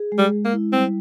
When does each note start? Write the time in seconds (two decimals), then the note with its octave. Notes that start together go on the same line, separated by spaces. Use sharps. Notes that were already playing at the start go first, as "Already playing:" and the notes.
Already playing: G#4
0.12 G#3
0.18 G3
0.32 G#3
0.45 A#3
0.53 E4
0.72 G3 C4